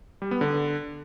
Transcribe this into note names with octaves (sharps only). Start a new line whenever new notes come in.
G3
B3
D3